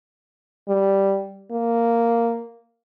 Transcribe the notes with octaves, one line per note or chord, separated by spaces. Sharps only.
G3
A#3